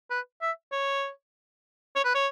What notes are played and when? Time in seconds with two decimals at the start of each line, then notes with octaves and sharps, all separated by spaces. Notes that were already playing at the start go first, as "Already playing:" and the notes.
0.10 B4
0.42 E5
0.72 C#5
1.96 C#5
2.05 B4
2.15 C#5